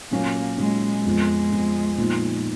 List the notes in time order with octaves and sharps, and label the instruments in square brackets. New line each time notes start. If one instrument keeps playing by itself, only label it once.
[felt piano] A#2 F#3 C#4 [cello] A#3
[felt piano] A#2 F#3 C#4 [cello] G#3
[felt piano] F2 F3 B3 [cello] G#3
[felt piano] F2 F3 B3
A#2 F3 B3 D#4